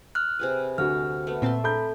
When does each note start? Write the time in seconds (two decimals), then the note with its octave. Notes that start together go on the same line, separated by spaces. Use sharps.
0.15 F6 F#6
0.39 C3 G#4 B4
0.78 D2 F#4 F6
1.27 A3 B3
1.42 A#2 C4 E5 A5 C6
1.64 A4 A#5 B5 G6